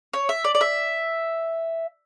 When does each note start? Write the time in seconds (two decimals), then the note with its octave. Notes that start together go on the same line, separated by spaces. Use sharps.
0.13 C#5
0.29 E5
0.44 D5
0.55 D5
0.61 E5